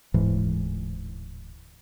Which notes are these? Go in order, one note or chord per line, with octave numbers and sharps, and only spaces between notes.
D1 G#2 E3